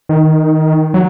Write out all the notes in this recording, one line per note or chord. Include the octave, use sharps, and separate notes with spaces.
D#3
F#3